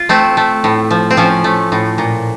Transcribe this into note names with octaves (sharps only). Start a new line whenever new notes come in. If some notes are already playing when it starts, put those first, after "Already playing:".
Already playing: F4
A3 C4
A3
A2
F3
C4
F3 C#4
A3
A2
A#2